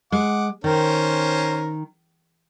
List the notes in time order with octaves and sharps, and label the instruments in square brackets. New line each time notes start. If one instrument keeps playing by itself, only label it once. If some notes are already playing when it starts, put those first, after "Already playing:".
[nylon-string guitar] G#3 [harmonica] F#5 D6
[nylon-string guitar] D#3 [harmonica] C#4 A#4 C5